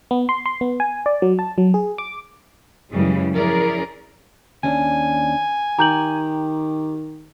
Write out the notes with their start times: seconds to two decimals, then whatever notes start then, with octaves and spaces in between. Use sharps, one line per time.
0.11 B3
0.29 C6
0.46 C6
0.61 B3
0.80 G#5
1.06 D5
1.22 F#3
1.39 A5
1.58 F#3
1.74 G#4
1.98 D6
2.90 F#2 C#3 E3 G3 G#3
3.31 F3 C#4 E4 G#4 A#4 D5
4.63 D#2 C#4 D4 G#5
5.79 D#3 G4 A#5 G6 F#7